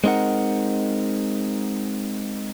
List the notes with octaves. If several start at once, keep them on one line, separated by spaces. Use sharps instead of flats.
G#3 C4 D#4 A#4 F#5